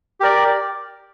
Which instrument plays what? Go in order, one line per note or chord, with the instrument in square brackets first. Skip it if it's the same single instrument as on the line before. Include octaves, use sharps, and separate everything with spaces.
[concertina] G4 A#4 D5